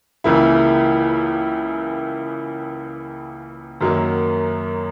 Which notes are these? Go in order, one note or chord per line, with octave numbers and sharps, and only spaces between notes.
C#2 C#3 E3 A#3 E4
F#2 D#3 F#3 A#3